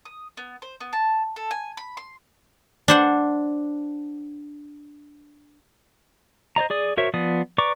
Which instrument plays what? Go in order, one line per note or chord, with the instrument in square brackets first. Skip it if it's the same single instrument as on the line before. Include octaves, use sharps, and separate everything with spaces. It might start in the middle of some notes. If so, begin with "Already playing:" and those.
[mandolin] D#6
B3
C5
B3
A5
A4
G#5
B5
C6
[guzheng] D4 C5 F#5
[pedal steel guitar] C5 D5 D#5 A#5
G#4 D5 D#6
F#4 A#4 C5 C#5 E5
F3 B3 D5 D#6
B4 D5 A#5 C#6 D6